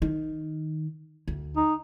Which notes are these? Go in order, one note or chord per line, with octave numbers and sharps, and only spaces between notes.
D#3
D2
D#4